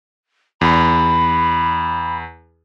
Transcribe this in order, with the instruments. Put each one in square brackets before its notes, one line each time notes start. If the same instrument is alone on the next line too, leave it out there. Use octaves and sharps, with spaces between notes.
[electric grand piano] E2 [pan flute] B5